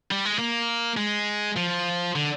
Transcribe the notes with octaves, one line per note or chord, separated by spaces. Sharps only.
G3
G#3
A#3
G#3
F3
D3